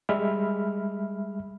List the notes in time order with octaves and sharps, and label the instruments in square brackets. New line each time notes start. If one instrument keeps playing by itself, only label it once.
[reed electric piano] G3 G#3 E5 B5 F6